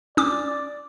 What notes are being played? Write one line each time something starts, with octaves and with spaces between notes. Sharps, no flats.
C#4 D5 D6